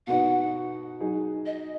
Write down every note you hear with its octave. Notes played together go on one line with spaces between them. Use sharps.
B2 B3 D#4 F#4 F#5
F#3 D#4 G#4
D#5